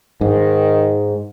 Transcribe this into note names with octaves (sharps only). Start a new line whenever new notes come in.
G#2 D#3